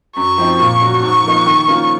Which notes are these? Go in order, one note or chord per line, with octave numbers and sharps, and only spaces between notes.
F#2 C#6
F3 C4 D#4
A#2
F#3 C#4 F#4
G#2 C#6
F3 A#3 D#4
D#3
A#3 C#4 F4